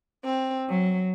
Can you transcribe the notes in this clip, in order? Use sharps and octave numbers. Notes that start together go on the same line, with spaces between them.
C4
F#3